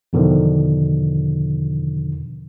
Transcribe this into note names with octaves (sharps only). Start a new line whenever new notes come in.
E2 B2 D3 D#3 F3